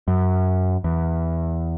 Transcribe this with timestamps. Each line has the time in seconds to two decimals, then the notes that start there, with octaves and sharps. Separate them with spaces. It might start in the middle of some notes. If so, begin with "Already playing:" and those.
0.08 F#2
0.84 E2